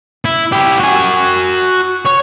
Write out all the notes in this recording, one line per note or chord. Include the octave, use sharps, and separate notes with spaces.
E4
E4 G4
F#4 G#5
C#5